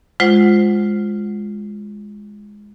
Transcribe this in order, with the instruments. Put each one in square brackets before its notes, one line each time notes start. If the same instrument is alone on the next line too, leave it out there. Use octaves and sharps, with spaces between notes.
[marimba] G#3 F4 C5 F#5